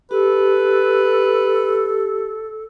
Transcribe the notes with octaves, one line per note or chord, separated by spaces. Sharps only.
G4 A4 B4